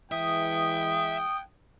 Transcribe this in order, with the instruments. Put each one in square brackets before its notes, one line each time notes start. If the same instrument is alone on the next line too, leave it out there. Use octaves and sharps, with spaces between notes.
[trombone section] E3 G#3 [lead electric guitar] E5 [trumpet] G5 [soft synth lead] D#6